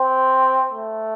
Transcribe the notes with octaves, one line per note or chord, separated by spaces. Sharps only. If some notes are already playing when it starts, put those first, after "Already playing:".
Already playing: C4
A3